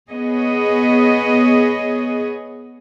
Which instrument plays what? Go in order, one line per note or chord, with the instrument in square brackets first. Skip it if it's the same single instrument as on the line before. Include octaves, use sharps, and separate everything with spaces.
[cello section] B3 G#4 C#5 D#5